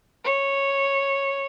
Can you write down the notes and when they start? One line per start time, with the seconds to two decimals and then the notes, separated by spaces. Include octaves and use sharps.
0.24 C#5